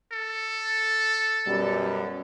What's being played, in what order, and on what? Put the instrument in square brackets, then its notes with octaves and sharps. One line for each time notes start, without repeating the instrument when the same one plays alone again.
[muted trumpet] A4
[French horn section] F#2 B2 G3